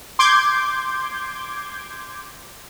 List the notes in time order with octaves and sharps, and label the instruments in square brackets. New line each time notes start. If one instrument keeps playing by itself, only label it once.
[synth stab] C6 D6 G6 G#6